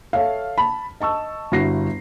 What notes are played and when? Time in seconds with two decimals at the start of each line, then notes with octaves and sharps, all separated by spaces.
0.13 A4 C#5 E5 F5
0.57 A5 B5
1.00 D#5 A5 C#6 E6
1.52 G1 E4 F#4 A#6 C7